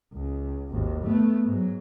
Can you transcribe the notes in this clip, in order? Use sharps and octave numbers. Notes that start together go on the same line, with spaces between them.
C#2
G#1 D#2
A3 B3
G#2 F#3